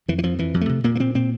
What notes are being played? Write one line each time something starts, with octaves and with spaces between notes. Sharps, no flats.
F2 E3
E3
F2 F3
F2 E3
F2
A3
C3
A#2 A#3
A#3
A#2 C4
A#2 C4